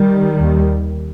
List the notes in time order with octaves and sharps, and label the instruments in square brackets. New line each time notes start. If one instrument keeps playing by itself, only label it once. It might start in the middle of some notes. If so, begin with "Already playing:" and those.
Already playing: [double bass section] D#3 G3
D#2